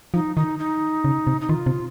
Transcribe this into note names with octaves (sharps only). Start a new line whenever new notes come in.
F3 D#4
D#3 D#4
D#4
C#3
C3
D#4
D#3 F4
C3